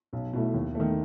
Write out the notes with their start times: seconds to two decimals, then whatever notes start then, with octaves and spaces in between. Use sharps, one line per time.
0.13 B1
0.33 B2 A3 E4
0.54 D#2
0.75 D#3 A3